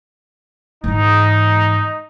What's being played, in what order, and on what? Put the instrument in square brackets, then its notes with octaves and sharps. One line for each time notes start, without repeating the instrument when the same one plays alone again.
[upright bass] G#2 E3 [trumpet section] D#4